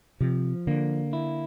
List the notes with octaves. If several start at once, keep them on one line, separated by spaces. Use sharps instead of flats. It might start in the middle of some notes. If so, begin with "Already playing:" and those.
C3 F3
D3 A#3
E4